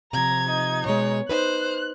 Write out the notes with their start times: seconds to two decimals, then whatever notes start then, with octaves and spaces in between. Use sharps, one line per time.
0.13 C3 F3 A#5 G#6
0.51 D#4
0.86 B2 G#3 C#5
1.29 D#4 B4 C5 F#6